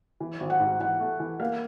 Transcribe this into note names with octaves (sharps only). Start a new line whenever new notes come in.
E3
G#1
F#5
G#2
E3 F#5
A3
E3
A#3 F5